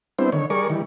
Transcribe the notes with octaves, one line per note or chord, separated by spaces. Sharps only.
G3 B3 C4 D4 E4 C5
D3 D#3 C#5
G3 G#4 A#4 D5 C#6
D#3 E3 G3